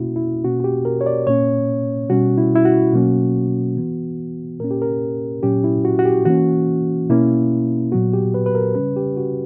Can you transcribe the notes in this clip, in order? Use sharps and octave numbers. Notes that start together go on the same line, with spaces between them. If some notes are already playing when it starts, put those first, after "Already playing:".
Already playing: B2 A#3 C#4 E4 F#4
E4
B2 A#3 C#4 F#4
F#4
G4
A#4
C#5
D5
A#2 A#3 C#4 C#5
B2 G3 C#4 F#4
E4
E4
F#4
B2 F#3 A#3 C#4
E3 B3
A#2 A#3 C#4 A#4
G4
A#4
A#2 F#3 C#4 G4
E4
F#4
F#4
G4
E3 A#3 C#4 F#4
B2 A#3 C#4 E4
A#2 F#3 B3 F#4
G4
B4
B4
A#4
C#3 G3 C#4 B4
G4
F#4